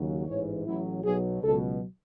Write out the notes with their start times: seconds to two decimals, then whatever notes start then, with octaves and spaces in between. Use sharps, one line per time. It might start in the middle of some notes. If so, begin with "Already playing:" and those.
Already playing: D#2 C#3 F#3
0.26 A1 G#2 E3 C#5
0.65 A1 A2 F#3 E4
1.04 B1 B2 F#3 G#4
1.43 C#2 B2 F#3 A4